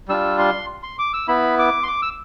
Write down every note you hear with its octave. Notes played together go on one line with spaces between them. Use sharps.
G3 D4 F4 E6
C6
C6
D6
E6
B3 E4 B5
D6
C6
D6
E6